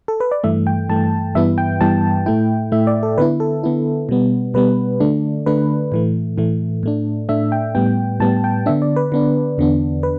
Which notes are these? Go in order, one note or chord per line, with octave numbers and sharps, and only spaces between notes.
A4
B4
D5
G2 E3 A3 E5
G5
G2 E3 A3 A5
G2 E3 G3 B3 E4 E5
G5
G2 E3 G3 B3 E4 A5
A2 A3 E4 G5
A2 A3 E4 E5
D5
A4
D3 B3 E4 B4
A4
D3 B3 E4
B2 G3 B3
B2 G3 B3 B4
D3 A3 D4
D3 A3 D4 B4
A2 E3 A3
A2 E3 A3
A2 A3 D4
A2 A3 D4 E5
G5
A2 G3 B3 G5
A2 G3 B3 A5
G5
D3 B3 D4 E5
D5
B4
D3 B3 D4
E2 D3 B3 D4
B4